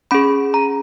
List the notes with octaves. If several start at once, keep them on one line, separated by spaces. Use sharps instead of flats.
C#4 G#4 B5
A#5